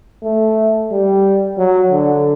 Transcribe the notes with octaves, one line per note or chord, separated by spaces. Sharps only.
A3
G3
F#3
D3